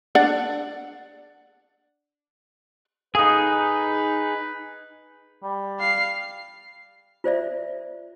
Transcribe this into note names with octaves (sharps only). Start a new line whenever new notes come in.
D4 D5 F#5
D#4 G#4 A4 B4 F5 D#6
G3
F5 C7
F4 C5 D5 E5